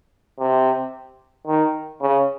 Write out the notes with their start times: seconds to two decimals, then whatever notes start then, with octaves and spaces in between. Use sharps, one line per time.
0.39 C3
1.47 D#3
2.01 C#3